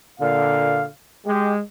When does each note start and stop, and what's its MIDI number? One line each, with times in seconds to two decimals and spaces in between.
0.20 0.86 46
0.20 0.86 50
0.20 0.87 77
1.26 1.61 56
1.26 1.54 67